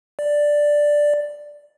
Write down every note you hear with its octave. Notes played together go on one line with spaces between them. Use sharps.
D5